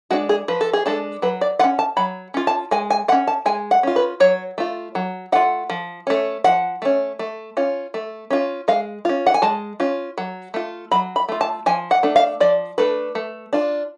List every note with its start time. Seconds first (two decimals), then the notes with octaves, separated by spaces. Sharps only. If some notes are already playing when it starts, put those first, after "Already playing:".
0.10 G#3 D4 F#4
0.29 G#4
0.48 F3 B4
0.61 A4
0.73 G#4
0.86 G#3 D4 A4
1.22 F#3 B4
1.41 D5
1.59 F4 F#5
1.64 C#4
1.79 A5
1.97 F#3 B5
2.34 C#4 F4
2.47 A5
2.71 G#3 G#5
2.90 G#5
3.08 F4 F#5
3.12 C#4
3.28 A5
3.46 G#3 G#5
3.71 F#5
3.83 C#4 F4
3.96 B4
4.20 F#3 C#5
4.58 A3 F4
4.95 F#3
5.32 A3 F4 F#5
5.70 F3
6.07 A3 C#4
6.44 F3 F#5
6.82 A3 C#4
7.19 A3
7.57 C#4 F4
7.94 A3
8.30 C#4 F4
8.68 G#3 F5
9.05 C#4 F4
9.26 F#5
9.34 G#5
9.42 G#3 A5
9.80 C#4 F4
10.18 F#3
10.54 A3 F4
10.91 F#3 B5
11.16 B5
11.29 A3 F4
11.41 A5
11.66 F3 G#5
11.91 F#5
12.03 A3 D4
12.16 F5
12.40 F3 D5
12.78 A3 D4 B4
13.15 A3
13.53 D4 F4